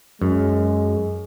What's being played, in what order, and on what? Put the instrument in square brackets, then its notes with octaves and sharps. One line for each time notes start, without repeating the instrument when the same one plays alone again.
[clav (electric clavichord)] F#2 [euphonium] G#3